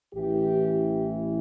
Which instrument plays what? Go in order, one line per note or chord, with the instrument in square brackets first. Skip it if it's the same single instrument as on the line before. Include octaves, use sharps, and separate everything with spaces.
[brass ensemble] A1 A2 E3 G4